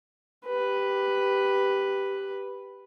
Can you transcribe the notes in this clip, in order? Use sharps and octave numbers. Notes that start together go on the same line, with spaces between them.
G4 B4